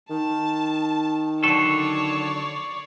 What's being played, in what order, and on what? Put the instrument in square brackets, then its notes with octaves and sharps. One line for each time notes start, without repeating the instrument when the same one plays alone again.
[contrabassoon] D#3 [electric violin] A5
[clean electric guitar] D3 F#3 A4 [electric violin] C#5 D5 [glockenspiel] C#6 C7